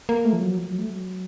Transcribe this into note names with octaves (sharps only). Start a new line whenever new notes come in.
A#3
A3
F3
F#3
F3
F#3
A3
F#3